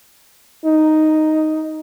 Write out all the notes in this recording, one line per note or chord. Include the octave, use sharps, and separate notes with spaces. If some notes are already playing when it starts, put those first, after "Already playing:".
D#4